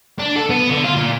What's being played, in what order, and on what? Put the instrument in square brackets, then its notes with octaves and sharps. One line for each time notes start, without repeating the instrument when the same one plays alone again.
[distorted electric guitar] D4
A4
B3
D3
F4
A#2